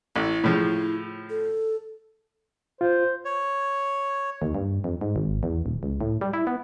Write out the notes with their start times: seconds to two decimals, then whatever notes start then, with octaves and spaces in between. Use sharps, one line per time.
0.16 A1 E4
0.44 A2 C#3 F3
1.30 A4
2.81 F4 C5
3.25 C#5
4.42 D#2
4.55 G2
4.84 F2
5.01 G#2
5.16 G#1
5.43 E2
5.66 D#1
5.83 C#2
6.01 A2
6.21 G3
6.33 E4
6.47 B3